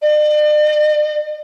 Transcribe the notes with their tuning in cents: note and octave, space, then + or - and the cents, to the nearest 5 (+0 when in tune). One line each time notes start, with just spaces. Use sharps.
D5 +45